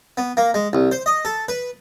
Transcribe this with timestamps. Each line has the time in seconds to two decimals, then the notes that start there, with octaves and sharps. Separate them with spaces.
0.17 B3
0.37 A#3
0.54 G#3
0.73 C2
0.92 C5
1.06 D#5
1.25 A4
1.48 B4